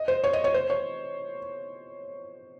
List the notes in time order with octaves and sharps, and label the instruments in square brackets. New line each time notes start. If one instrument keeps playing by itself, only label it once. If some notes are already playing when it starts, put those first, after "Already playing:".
Already playing: [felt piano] D#5
C5
C#5
D#5
C#5
C5
C#5